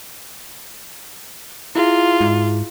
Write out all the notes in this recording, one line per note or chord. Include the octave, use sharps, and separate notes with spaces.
E4 F4 G#4
G#2